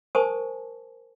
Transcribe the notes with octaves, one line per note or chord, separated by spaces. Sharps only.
A#4 C5 G#5 A5 C#6 D#6